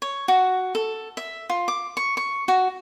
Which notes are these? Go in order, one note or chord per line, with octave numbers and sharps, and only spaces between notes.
C#5
F#4
A4
E5
F4
D6
C#6
C#6
F#4